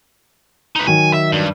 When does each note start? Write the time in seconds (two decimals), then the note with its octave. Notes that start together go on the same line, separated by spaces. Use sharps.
0.76 D#4 B4
0.87 D#3 F#3 G#5
1.13 E5
1.32 G2